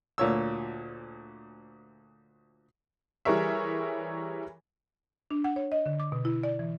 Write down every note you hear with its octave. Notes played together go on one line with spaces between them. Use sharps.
D2 A#2 C#5 E6
E3 G3 G#4 A#4 C#5 E5
D4
F#5
C#5
D#5
D3
D6
B2
E4
D5
E3